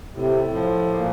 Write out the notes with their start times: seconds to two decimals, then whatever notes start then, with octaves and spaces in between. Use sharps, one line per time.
0.15 A2 C3
0.54 F3
0.93 A#2 A#3